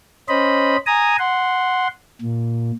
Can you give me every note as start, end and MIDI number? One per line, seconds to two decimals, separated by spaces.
0.29 0.77 61
0.29 0.77 72
0.29 0.77 75
0.29 0.77 83
0.86 1.16 80
0.86 1.16 82
0.86 1.16 87
1.19 1.88 78
1.19 1.88 84
2.21 2.71 46